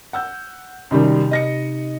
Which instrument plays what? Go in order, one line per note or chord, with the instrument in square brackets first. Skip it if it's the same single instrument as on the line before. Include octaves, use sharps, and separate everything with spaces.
[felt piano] F#5 E6 G6
[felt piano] F#2 D#3 G3 [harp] C3 D#4 B5
[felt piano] D#5 A#6 C#7